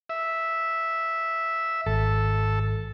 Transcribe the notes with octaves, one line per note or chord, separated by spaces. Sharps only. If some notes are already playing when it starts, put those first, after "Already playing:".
E5
G#1 A4